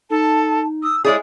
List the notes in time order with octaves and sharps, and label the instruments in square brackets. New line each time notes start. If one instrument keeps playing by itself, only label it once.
[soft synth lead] D#4 [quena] A4 [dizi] A5
[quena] D#6 [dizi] E6
[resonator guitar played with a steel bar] G#3 E4 G#4 [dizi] C#5 [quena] D5